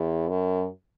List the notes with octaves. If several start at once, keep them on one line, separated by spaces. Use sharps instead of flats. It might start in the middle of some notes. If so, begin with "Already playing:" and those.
Already playing: E2
F#2